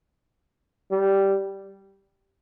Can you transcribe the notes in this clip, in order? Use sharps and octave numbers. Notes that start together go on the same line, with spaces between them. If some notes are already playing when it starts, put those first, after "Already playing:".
G3